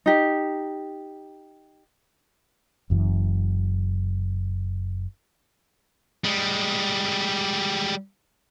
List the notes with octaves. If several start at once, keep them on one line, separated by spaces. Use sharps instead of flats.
D#4 G4
F#1 F#2 E3
G3 G#3